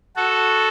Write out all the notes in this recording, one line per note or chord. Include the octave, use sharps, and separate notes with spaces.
F#4 A4